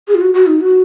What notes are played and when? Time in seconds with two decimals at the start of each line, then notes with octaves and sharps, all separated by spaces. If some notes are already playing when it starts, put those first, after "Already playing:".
0.08 G#4
0.15 F4
0.21 F#4
0.34 F#4
0.47 D#4
0.61 F#4